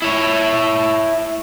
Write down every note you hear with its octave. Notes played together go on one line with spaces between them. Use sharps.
E4 C#5